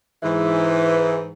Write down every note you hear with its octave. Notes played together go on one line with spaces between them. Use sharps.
G#2 E3